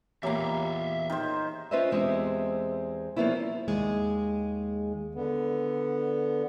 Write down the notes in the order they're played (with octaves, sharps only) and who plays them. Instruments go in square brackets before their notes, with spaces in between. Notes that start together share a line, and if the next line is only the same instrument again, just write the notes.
[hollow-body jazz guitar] E2 A#2 [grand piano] G4 C#5 A#5 [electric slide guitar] E5 F5
[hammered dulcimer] D#3 C5
[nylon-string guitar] C#4 F4 B4 C5 D#5 E5
E2 G#3 C4 G4 C5 E5
F3 G3 A#3 B3 C#4 E4
[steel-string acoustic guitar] D#2 G#3 G#4
[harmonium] D3 B3